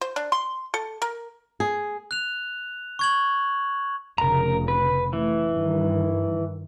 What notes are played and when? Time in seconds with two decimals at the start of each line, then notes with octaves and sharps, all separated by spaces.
0.01 C5
0.16 D4
0.32 C6
0.74 A4
1.02 A#4
1.60 G#4
2.11 F#6 F7
2.99 C#6 G#6 F#7
4.18 F1 C#3 A#4 A#5
4.68 B4
5.13 E3 A3
5.52 G2 D#3